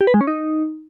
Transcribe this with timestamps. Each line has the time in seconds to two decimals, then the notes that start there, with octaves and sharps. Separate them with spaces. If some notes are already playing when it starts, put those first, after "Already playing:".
0.01 G4
0.07 B4
0.14 G#3
0.21 C#4
0.27 D#4